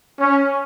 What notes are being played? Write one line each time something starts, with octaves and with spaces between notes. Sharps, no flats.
C#4